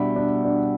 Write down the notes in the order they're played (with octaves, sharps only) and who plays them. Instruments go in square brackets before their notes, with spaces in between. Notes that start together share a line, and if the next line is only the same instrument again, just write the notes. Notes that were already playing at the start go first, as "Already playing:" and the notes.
Already playing: [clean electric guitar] B2 G3 B3 E4 [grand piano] D4
[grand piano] D4
D4